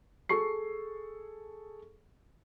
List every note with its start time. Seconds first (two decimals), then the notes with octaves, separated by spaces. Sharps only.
0.29 G#4 A4 C#6 C7